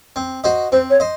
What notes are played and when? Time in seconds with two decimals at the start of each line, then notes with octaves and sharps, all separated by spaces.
0.16 C4
0.44 F#4 C5 D#5
0.72 C4 C5
0.90 C#5
1.00 C5 D#5